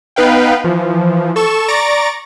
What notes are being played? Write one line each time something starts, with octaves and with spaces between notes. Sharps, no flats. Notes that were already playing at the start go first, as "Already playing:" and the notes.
B3 D#4 B4 F5 G5
E3 F3
A4 C#6 E7
D5 A#5 C#6 A6 A#6 D7